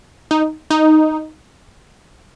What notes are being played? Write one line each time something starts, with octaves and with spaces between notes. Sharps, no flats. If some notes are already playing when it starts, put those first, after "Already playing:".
D#4
D#4